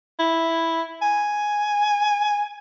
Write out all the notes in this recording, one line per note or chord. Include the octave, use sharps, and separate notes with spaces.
E4
G#5